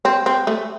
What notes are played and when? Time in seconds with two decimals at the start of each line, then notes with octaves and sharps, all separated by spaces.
0.05 C4
0.26 C4
0.47 A3